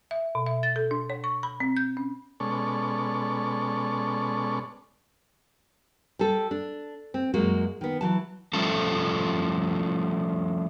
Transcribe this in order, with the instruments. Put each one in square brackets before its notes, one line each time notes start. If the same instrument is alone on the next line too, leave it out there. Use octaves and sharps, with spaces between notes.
[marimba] E5
B2
E5
A6
A4
D4
C#5
C#6
B5
C4
G6
C#4
[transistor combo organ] B2 G#3 C#4 A4 D5 C#6
[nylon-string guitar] G3 A4
D4
C4
F#2 G#3 A#3 F#4
D#3 B3
E3 F#3 A5
[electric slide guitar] F3 G3 A3 C#4 F4 A4